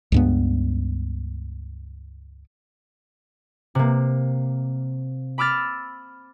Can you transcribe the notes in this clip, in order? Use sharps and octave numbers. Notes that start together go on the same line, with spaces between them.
C#2 G2 B3
C3 A#3
B5 D6 E6 F6 A6